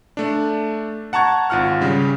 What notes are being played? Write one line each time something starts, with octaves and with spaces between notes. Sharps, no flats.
A3 D4
F#5 A5 A#5 C#6 G#6
G#1 F4 F#5 F6
C#3 G3